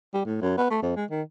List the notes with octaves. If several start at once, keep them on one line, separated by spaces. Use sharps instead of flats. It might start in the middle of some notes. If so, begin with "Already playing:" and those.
G3
A2
F#2
B3
A3
F2
G#3
D#3